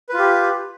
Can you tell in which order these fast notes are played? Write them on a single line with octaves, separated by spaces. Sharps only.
B4 F4 G4